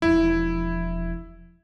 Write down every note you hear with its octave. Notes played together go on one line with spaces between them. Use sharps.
E1 F3 E4